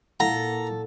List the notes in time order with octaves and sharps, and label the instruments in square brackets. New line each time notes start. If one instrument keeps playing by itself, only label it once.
[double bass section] A#2 [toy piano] E4 F5 F#5 [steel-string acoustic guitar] A4 [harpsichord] A#5